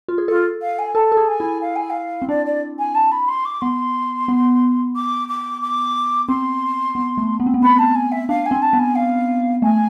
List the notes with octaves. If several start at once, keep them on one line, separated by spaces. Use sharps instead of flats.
F4
G#4
F4 A4
F5
G#5
A4 A5
A4
G#4
G#5
E4
F5
G#5
F5
C4
D4 D5
D5
G#5
A5
B5
C6
D6
B3 C6
B3
D6
D6
D6
C4 C6
B3
A3
B3
C4
B3
C4 B5
A5
G#5
E5
D4 F5
G#5
C4
A5
B3
G#5
F5
A3 G#5